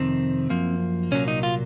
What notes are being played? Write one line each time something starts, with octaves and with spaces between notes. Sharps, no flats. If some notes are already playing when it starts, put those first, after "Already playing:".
Already playing: F2 C3 D#3 C4
F#2 F3 A#3
C2 A#2 F#3 A#3 C#4
D#4
F4